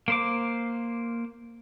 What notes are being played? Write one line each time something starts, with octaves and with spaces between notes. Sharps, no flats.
A#3 C5 D6